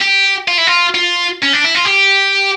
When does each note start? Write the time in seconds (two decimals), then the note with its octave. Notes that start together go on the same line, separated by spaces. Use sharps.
0.02 G4
0.48 F4
0.58 E4
0.67 F4
0.94 F4
1.43 C#4
1.54 D4
1.65 E4
1.75 F4
1.86 G4